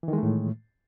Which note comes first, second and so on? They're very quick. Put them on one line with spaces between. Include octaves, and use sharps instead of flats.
E3 D#3 G#3 A3 A2